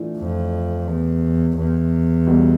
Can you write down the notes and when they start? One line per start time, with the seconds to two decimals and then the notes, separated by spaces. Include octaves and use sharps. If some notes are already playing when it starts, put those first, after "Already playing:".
Already playing: A2 E3 A3 D4 F4
0.18 F2
0.88 E2
1.57 E2
2.27 B1 B2 G3